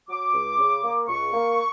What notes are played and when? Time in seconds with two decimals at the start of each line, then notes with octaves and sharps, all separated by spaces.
0.09 F#3 D6
0.34 C#2
0.58 C#3
0.83 A#3
1.08 C#2 C#6
1.33 A#3